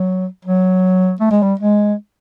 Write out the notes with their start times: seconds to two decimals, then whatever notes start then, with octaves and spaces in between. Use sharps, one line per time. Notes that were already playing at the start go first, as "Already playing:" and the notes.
Already playing: F#3
0.45 F#3
1.20 A3
1.31 G#3
1.42 G3
1.59 G#3